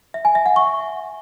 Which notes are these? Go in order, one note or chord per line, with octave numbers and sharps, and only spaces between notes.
E5
G#5
E5
F#5
C#6